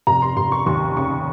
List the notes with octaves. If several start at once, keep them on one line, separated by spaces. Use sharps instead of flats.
F1 A#5
C6
F1 C6
C#6
D#2 C#6
C#3 C#6